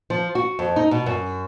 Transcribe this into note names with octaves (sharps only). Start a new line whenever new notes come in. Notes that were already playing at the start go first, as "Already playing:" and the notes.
F3
F#4
F2
D#4
B2
F#2